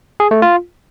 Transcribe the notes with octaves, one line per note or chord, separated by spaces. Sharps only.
G#4
A3
F4